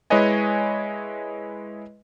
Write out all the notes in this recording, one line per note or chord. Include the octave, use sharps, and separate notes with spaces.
G#3 E4 B4 C#5 D#5 G#5